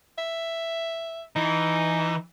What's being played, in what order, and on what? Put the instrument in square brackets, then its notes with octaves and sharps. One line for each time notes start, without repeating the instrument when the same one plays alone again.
[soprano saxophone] E5
[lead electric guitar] E3 [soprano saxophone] D#4